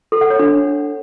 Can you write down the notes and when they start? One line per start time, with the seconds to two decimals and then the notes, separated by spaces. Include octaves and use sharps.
0.12 A4
0.21 F#5
0.30 C#5
0.39 D4